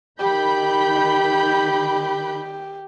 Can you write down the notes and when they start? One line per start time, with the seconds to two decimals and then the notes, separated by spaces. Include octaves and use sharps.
0.20 D#3 G4 B5 G6